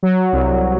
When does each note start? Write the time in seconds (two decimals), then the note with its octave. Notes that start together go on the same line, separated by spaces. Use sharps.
0.03 F#3
0.33 C2